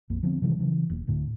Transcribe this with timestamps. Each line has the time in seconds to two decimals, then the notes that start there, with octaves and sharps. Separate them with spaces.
0.10 A#1 F2 A#3
0.23 D3 F3 B3 C4
0.42 C3 D#3 E3 G3
0.59 C#3 E3 F#3
0.90 E1 A#3
1.07 D1 A2 D3